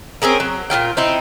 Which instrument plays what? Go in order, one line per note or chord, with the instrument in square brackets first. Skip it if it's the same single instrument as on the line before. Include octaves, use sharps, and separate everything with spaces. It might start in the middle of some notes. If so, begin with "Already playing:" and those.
[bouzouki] C4 C#4 G#4 A#4
F#3
A#2 C4 F4 G5
C4 D#4 E4